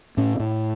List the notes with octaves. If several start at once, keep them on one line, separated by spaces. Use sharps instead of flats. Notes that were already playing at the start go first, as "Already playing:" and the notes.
A2 C#4
A2